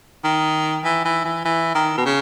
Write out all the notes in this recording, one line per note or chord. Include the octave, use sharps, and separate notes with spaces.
D#3
E3
E3
E3
E3
D#3
B2
C#3